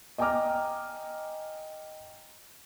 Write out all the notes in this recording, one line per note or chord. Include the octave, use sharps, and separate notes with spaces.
D#5 G5 G#5 A#5 D6 F6